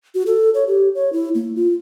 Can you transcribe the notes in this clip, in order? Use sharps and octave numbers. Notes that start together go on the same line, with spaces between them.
F#4
A4
C#5
G4
C#5
E4
A#3
F4